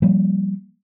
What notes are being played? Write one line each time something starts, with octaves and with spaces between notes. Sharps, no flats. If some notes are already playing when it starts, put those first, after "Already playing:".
F3 G3 A#3